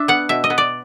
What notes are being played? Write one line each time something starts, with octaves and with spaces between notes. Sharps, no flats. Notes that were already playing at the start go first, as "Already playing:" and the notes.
Already playing: D4 E5
B3 F#5
B2 E5
D#5
B3
D5